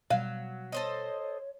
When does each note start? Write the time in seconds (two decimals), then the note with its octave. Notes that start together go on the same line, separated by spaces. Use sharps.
0.10 B2 F#3 G3 F5
0.72 A4 C5 C#5 D#5